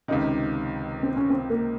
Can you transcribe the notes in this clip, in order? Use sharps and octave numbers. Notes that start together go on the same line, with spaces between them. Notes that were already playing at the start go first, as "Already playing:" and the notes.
C#2 C3 D#3 D#4
C4
C#4
C4
A#3